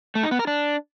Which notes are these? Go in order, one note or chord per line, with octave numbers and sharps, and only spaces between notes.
A3
D#4
B3
A#4
D4